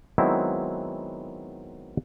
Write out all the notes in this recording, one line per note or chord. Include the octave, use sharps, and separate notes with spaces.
D#3 F#3 G#3 B3 C4 E4